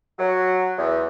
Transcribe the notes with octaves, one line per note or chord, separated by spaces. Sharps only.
F#3
E2